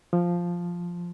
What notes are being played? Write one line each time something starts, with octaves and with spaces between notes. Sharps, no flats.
F3